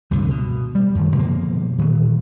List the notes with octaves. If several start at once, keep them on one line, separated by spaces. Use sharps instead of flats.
C#2 G2 C3 D#3
B2
G3
F#2 D#3
B2 D3 F3 A#3
A#2 D#3 E3